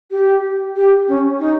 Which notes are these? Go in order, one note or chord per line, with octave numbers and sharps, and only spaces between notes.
G4
G4
C#4
D#4